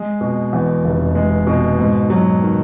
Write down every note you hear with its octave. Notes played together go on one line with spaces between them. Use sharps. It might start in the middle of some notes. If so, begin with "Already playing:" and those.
Already playing: G#3
B2
E2
F1
G#3
B2
G#2
F#3
D#3